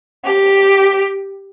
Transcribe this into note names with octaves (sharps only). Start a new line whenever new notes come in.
G4